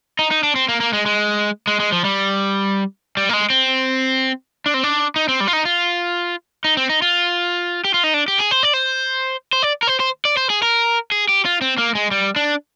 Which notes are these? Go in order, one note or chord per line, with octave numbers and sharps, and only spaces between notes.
D#4
D#4
D4
C4
A#3
A#3
G#3
G#3
G#3
G#3
F3
G3
G3
A#3
G#3
C4
D4
C4
D4
D#4
C4
G3
F4
D#4
F4
D#4
C4
D#4
F4
G4
F4
D#4
D4
G4
G#4
C5
D5
C5
C5
D5
A#4
C5
C5
D5
C5
G#4
A#4
G#4
G4
F4
C4
A#3
G#3
G3
D4